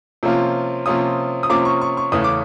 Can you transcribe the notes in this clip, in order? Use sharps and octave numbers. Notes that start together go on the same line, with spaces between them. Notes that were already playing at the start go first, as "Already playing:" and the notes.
C3 F3 A#3 C#4 F4
C3 F3 A#3 C#4 F4 D#6
D#6
C3 F3 A#3 C#4 F4 D6
C#6
C#6
C#6
E2 C#3 E3 A3 C#4 D#6
D6